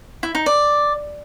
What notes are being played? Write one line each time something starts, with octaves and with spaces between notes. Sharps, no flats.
E4
D#4
D5